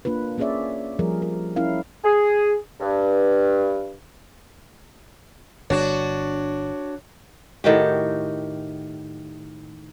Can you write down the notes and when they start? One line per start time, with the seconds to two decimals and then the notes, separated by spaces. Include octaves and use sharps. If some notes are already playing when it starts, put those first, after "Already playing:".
0.05 A#3 D4 F4 B4
0.38 A#3 C#4 G#4 C#5 D5 E5
0.99 F3 G3 G#4 A#4
1.22 A#4
1.56 C#4 E4 A#4 F5
2.04 G#4
2.80 G2
5.70 G1 D4 F#4 C#5
7.64 A2 D#3 F#4 G4